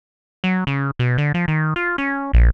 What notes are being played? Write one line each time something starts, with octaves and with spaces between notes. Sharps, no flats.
F#3
C#3
B2
D3
F3
D#3
F4
C#4
A#1